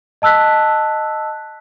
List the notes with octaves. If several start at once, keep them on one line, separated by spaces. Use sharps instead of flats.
D#5 A5 E6 F#6 B6